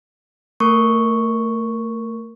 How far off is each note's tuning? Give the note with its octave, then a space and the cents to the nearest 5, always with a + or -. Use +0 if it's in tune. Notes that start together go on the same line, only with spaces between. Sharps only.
A3 +35 A#4 +5 C#6 +0